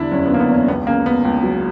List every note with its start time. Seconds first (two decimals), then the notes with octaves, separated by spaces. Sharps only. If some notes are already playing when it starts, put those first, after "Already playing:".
Already playing: E2 D3 G3 D4 E4
0.11 F#1 C#4
0.26 B3
0.30 D3 A#3
0.40 B3
0.49 E2 C#4
0.68 C#2 B3
0.87 C#3 A#3
1.05 C#3 B3
1.25 C#2
1.43 F#3